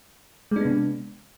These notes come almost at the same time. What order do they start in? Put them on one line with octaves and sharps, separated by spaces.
G#3 D4 B3 C3